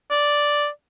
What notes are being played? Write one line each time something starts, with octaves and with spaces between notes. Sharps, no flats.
D5